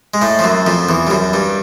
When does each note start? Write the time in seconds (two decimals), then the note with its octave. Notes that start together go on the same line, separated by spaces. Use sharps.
0.14 G#3
0.22 A2 A3
0.39 F3
0.44 F#2 F#3
0.66 F2 F3
0.89 E2 E3
1.07 G3
1.10 F#2 F#3
1.33 G2 G3